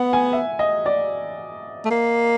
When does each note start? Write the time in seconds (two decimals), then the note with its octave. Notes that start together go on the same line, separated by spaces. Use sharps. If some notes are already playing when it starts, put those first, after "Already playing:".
Already playing: B3 F#5
0.13 G#5
0.33 E5
0.59 D#5
0.86 D5
1.85 A3
1.90 A#3